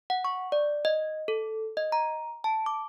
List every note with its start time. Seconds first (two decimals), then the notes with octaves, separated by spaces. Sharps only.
0.10 F#5
0.25 C#6
0.52 D5
0.85 D#5
1.28 A4
1.77 D#5
1.92 A#5
2.44 A5
2.66 D6